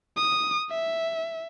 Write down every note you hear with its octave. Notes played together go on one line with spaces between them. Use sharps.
D#6
E5